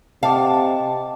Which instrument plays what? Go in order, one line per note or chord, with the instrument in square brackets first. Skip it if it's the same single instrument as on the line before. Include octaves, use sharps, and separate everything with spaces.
[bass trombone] C3 [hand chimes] D#5 G5 D6 [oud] F5 [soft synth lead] A5